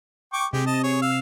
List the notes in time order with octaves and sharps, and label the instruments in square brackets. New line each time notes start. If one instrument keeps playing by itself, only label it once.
[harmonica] G5 C#6 D6
[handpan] C3 [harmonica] G#3 G4
[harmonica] D#5 A5
G#4 C#5
F5 E6